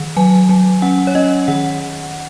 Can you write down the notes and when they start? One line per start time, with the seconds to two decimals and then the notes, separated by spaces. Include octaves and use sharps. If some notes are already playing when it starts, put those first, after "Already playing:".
Already playing: D#3
0.17 F#3 G#5
0.49 F#3
0.82 C#4 F#5
1.07 C#5
1.15 C#4 D#5
1.48 D#3 F#5